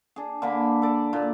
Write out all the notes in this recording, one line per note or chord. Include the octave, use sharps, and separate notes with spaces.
D4 G#4
D3 A#3 B5
A4 D5
A#2